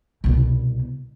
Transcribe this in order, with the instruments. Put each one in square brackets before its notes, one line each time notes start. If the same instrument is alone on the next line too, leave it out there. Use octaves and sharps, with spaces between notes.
[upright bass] C2 B2